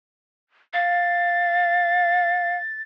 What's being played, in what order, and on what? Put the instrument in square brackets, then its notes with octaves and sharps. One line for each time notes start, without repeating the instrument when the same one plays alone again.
[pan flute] F5 [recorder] A6